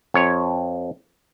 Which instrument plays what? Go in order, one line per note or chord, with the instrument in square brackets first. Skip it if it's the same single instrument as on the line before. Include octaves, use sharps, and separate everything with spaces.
[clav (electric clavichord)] F2 C#5